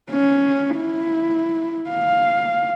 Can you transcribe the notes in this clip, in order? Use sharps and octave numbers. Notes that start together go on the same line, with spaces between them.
C#4
E4
F5